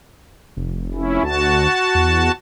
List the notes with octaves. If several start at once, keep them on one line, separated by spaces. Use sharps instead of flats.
F1
C#4 E4
D2 F#4 A5
E2